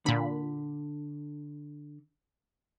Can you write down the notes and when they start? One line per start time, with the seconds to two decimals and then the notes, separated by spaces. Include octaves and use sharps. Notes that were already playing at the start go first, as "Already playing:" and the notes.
0.06 A#2 D3 B5